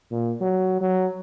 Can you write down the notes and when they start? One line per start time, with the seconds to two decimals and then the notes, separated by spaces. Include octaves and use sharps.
0.11 A#2
0.41 F#3
0.81 F#3